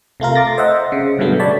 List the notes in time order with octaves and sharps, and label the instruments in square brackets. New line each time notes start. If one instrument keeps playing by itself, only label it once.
[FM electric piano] C3 A3 F4 A#4
C6 D6 A6 A#6
C5 D#5 E5 F#5
C#3
G2 B2 D3 F#3 A3 B3
C#5 D5 A5 B5